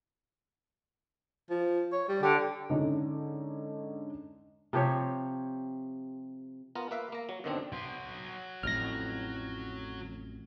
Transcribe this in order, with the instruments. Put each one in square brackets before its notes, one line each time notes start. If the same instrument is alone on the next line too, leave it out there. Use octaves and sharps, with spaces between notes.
[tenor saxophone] F3
C#5
G3
[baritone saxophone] D3 [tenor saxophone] G4
[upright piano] G#2 D3 C#4 D#4
[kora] C3 F3 G4 C#5
[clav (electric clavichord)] B3 F4 A#4
A#3 B4 E5 F5
A#3 A#5
F#3
F#2 B2 D3 D#3 C4 D4
[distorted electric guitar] F#3 C6
[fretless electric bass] A1 F2 A2 [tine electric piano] F6 A#6